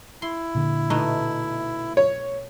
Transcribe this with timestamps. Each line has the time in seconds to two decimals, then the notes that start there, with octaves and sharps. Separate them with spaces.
0.22 E4 C6
0.55 A#2 D3
0.90 B2 A3 D#4
1.97 C#5